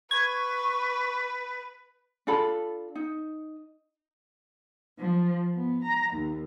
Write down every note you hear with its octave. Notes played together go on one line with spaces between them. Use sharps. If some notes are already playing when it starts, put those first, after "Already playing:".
B4 C#6 G#6
D4 F4 A4 B5
D#4
F3
B3
A#5
D#2